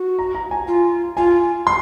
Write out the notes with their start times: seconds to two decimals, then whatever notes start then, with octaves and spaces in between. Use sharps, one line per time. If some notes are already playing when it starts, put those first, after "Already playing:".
Already playing: F#4
0.19 A#5
0.35 A#5
0.51 G#5
0.67 F4
1.17 F4 G#5
1.67 C6